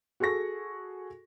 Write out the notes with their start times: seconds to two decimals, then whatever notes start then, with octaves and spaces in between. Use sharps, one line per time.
0.20 F#4 G#4 A4 C#6 A#6